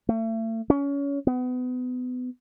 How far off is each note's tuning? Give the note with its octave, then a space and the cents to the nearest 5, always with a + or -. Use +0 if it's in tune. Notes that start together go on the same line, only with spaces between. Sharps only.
A3 +35
C#4 +25
B3 +30